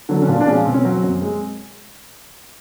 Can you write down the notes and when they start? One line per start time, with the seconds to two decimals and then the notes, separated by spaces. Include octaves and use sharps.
0.09 D3 F#3
0.22 C#4
0.28 A#2 D4
0.41 D4
0.47 F3 G#3 C#4
0.65 B2 C4
0.74 C#4
0.83 F#3 C4
1.03 F#2
1.22 G#3